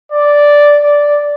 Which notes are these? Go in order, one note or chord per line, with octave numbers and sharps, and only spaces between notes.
D5
D5